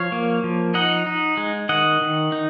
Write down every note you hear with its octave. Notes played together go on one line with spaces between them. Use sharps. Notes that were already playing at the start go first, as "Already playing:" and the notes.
Already playing: F3 C#5 F5
A#3
F3
D#4 D#5 F#5
D#4
G#3
D#3 D#5 F#5
D#3
D#4